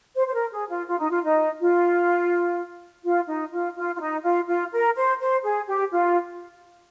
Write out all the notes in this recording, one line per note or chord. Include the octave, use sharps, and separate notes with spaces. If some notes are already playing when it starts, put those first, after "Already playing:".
C5
C5
A#4
G#4
F4
F4
D#4
F4
D#4
F4
F4
D#4
F4
F4
F4
D#4
F4
F4
A#4
C5
C5
G#4
G4
F4